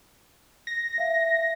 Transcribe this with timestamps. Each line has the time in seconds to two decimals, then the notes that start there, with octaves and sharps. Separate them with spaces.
0.67 A#6
0.98 E5 F5